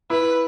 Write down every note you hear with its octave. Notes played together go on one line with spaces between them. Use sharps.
E4 B4